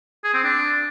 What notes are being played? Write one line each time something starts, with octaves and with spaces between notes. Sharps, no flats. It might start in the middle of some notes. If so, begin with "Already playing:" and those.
G#4
C4
D4